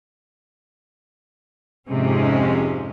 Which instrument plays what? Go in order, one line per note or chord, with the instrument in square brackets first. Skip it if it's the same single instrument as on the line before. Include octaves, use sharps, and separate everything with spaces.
[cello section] F2 G#2 C3 G#3 C#4